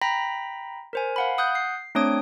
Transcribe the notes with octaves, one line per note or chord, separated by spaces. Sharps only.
G5 A#5 B5 A#6 B6
A#4 C5 G#5
F5 F#5 B5
F#5 D#6 F#6 G6
C7
A3 C4 D4 C#5 D#6 D7